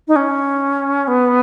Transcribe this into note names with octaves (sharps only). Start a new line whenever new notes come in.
D#4
C#4
B3